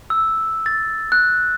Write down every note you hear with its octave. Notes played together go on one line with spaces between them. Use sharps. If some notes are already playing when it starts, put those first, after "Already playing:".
E6
A6
F#6